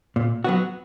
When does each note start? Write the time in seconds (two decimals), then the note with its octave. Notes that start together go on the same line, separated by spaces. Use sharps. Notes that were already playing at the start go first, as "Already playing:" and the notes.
0.16 A#2
0.44 F#3 B3 F#4